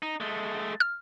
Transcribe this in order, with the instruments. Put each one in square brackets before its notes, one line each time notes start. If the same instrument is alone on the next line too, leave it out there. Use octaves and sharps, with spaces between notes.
[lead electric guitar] D#4
G#3 A3
[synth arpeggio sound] F6